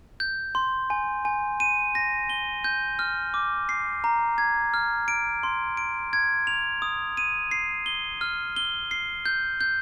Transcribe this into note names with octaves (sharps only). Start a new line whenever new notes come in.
G6
C6
G#5
G#5
D#7
A#6
G7
G6
F6
D6
C7
A#5
G#6
F6
D7
C6
D7
G#6
F7
D#6
D#7
C7
G7
F6
G7
C7
G6
G6